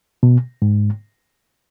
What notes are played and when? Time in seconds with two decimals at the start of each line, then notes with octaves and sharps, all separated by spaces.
0.23 B2
0.62 G#2